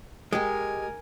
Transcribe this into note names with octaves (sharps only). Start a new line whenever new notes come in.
G#3 G4 A#4 G#5